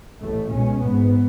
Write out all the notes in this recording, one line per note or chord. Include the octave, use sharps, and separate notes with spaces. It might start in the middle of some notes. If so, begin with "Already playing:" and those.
A1 A2 A3
C#2 B2 C#4
G#1 G#2 B3